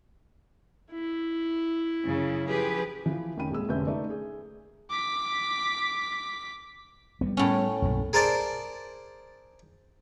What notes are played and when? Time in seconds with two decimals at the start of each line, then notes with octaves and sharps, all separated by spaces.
0.91 E4
2.03 F#2 C#3
2.48 F3 G4 G#4 B4
3.06 E3 F3
3.37 F1 D#3 C#4 G5 B5 D#7
3.51 D#1 C2 G#3 G#4 E6
3.69 F1 D3 C#4 B4 E5 G6
3.87 A3 D#4 B4 D5
4.10 G#4
4.90 D6 B6
7.21 G3 G#3 B3
7.37 A2 C#4
7.82 B1 F#2 A#2
8.13 G#4 A#4 C5 D5 A5